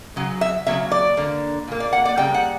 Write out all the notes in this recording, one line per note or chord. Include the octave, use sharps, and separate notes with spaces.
C#3 F#3
E5
C#3 F#3 A#3 E5
D5
D3 A#3
A#2 A#3
D5
F#5
D5
C#3 G3 A#3 G5
F#5